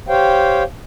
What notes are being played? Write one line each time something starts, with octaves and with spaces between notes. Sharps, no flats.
G4 C5 C#5 F5 G5